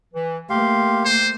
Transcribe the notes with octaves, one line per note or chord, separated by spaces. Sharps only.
E3
A3 A#3 G4 F5 C6
C5